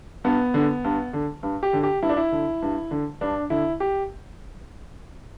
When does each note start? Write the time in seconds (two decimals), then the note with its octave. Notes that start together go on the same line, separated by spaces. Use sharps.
0.24 G2 B3
0.54 D3
0.84 G2
1.13 D3
1.43 G2
1.63 G4
1.73 D3
1.83 G4
2.02 G2 E4
2.09 D4
2.17 E4
2.32 D3
2.62 G2
2.91 D3
3.21 G2 D4
3.50 D3 E4
3.80 G4